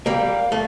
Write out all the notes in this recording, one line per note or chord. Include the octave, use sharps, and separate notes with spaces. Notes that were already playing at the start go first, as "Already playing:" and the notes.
G3 A#3 F5
A3